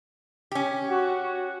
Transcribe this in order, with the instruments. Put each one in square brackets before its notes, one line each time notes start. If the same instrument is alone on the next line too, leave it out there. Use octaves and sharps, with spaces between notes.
[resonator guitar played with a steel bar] C#4 G4
[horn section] F#4